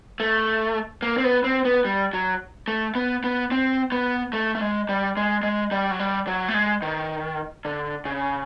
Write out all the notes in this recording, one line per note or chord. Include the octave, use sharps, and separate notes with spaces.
A3
A#3
C4
B3
C4
B3
G3
F#3
A3
B3
B3
C4
B3
A3
A3
G#3
G3
G#3
G#3
G3
F#3
G3
F#3
A3
G#3
D#3
D3
C#3